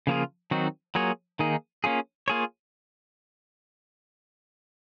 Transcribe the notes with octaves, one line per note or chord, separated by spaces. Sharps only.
C#3 F3 A#3 F4 G#4
D#3 F#3 C4 D#4 F#4
F#3 A#3 F4 G#4 C#5
D#3 A#3 D#4 G#4
A#3 C#4 F4 G#4
A#3 F4 G#4 C#5